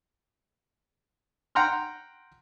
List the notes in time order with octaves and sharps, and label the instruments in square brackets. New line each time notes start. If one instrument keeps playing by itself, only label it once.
[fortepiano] F#5 G5 A#5 C6 F6